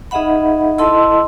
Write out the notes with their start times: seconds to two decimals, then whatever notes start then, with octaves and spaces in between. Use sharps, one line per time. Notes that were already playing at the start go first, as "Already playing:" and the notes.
0.11 D#4 G#4 D#5 E5 F#5 B5
0.78 E4 A4 D#5 A5 C6 E6